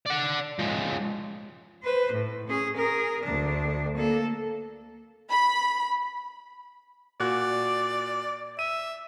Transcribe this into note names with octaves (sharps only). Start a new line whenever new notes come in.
D5 F#5
F3 G#3
B4 C5
A2
C#4 G#4
G#4 A#4
D2 D4
A#3 A4
B5
A#2 F#4 D5 F#6
E5 D#7